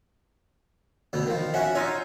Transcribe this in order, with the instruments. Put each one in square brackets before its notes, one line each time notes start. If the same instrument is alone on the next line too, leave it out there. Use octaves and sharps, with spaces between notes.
[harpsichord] D2 B2 A3
D#3 F3
[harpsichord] C#4 F#4 [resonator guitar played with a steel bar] E5 F#5
[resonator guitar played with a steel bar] D#4 F4 C#5 [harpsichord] E5